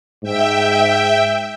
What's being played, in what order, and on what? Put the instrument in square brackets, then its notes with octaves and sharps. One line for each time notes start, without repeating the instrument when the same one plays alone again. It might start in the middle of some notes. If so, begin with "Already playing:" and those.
[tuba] G#2 [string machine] E5 G5